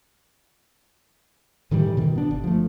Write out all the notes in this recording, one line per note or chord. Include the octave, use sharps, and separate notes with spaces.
A2 D#3 E3 G3
B2 D#3
B3 D4
G1
F3 A3